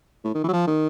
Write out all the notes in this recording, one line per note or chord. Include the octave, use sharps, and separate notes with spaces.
A2
D#3
E3
F#3
F3
D#3